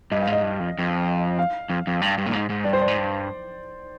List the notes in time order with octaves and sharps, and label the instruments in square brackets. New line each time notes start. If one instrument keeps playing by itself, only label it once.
[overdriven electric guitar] G2 [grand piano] D#5
[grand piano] F5
[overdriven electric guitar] G#2
[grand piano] D#5
[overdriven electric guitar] G2
F2
F2
[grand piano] F5
[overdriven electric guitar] F2
F2
G2
G2
A#2
G#2
G#2
[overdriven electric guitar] G2 [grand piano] D5
[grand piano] C5
D5
[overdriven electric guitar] G#2
G2